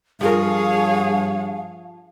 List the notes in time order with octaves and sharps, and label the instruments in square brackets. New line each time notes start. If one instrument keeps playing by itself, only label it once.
[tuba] G2 [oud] F3 F4 A#4 [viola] G#4 C#5 [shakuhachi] F5